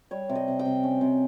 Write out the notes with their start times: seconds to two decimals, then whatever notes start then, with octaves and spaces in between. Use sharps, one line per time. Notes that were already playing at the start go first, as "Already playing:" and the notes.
0.11 G3 C#5
0.29 C3
0.35 D#5
0.48 C3
0.59 G5
0.65 C3
0.84 C#4
1.01 C3